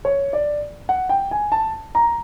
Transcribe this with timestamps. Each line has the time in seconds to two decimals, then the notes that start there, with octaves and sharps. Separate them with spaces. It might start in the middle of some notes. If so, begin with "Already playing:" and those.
0.05 C#5
0.33 D5
0.89 F#5
1.09 G5
1.31 G#5
1.52 A5
1.95 A#5